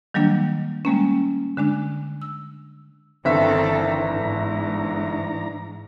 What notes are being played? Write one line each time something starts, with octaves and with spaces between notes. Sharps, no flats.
D#3 F#3 G3 A#3 D4
G3 G#3 A#3 C#4
D3 G#3 D4
E6
G1 D#3 E3 C4 D4 A4 E5 A#5
G#2